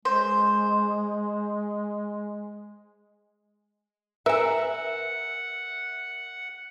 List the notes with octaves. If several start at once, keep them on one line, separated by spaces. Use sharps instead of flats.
G#3 C5
A#4 B4 E5 F#5 G#5 E6